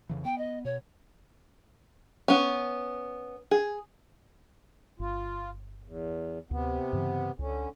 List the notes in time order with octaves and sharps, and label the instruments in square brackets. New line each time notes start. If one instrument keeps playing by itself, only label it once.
[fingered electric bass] F2 C#3 E3
[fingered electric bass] B3 [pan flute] G5
[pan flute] D#5
[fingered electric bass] B2 [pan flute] C#5
[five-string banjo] B3 C#4
G#4
[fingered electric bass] G1 [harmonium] F4
[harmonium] E2
[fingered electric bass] D2 [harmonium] C3 B3
[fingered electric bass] G2 C#3 E3
[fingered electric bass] C#2 [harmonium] D3 C#4